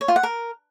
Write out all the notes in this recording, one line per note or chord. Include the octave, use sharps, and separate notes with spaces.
C#5
F4
F#5
A#4